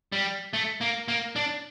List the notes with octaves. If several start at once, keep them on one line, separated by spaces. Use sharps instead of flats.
G3
A3
A#3
A#3
D4